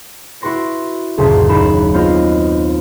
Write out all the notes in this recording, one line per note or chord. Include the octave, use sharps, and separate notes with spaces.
E4 F#4 B4 C6 A#6 D7
F#1 D2 A#2 A5 C6 B6
D#2 D#4 B5 C7 E7
B3 C4 F4 C5 D#5